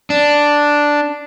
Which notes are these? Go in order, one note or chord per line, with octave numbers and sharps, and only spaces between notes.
D4